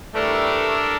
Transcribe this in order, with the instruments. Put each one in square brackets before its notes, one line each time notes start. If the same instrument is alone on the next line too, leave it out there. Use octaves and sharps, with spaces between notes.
[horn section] E3 G3 A3 [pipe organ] D4 A4 A#4